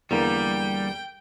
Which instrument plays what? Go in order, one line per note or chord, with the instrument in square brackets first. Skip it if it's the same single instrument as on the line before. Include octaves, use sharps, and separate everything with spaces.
[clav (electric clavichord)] E2 D3 A#3 [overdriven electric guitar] G3 [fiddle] G5